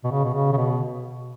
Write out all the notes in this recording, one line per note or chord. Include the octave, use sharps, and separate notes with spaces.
B2
C#3
B2
C#3
C#3
B2